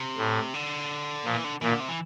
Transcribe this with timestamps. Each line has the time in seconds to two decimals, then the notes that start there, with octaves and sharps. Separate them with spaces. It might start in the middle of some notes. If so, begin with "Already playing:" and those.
Already playing: C3
0.17 A2
0.54 D3
1.25 A#2 F3
1.35 E3
1.44 D3
1.62 A#2 E3
1.71 D3
1.80 C3
1.89 E3